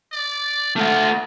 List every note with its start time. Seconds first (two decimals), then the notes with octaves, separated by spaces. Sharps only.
0.12 D5
0.76 A3 F4 F#5